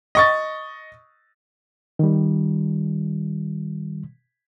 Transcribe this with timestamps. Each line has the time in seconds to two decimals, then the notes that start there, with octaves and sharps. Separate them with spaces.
0.15 D#5 C#6 A6
1.99 D#3 G3